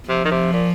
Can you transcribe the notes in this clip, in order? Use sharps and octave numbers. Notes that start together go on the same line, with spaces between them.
C3 F3
D#3
C3
A#2